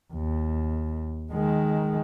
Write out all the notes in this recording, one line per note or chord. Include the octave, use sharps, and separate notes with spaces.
D#2
D#3 G#3